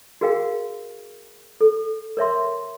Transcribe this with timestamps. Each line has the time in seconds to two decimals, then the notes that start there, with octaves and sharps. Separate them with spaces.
0.21 F#4 G#4 A#4 F5 G5
1.61 A4
2.17 A#4 C#5 E5 C6